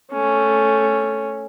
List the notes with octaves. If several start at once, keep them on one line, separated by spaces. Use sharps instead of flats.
A3 C#4